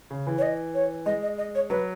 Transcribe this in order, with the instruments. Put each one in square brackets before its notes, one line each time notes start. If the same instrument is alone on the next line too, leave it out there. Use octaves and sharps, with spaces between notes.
[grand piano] C#3
E3
[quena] C#5
D#5
C#5
[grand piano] G#3 [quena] D#5
[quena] D#5
D#5
C#5
[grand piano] F#3 [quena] B4